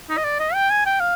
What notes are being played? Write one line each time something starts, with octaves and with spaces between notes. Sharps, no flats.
D#4
D#5
D5
D#5
G5
G#5
G5
F5